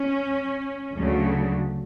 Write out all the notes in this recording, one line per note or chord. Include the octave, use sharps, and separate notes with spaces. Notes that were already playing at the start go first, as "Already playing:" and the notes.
Already playing: C#4
D2 C#3 F#3 A3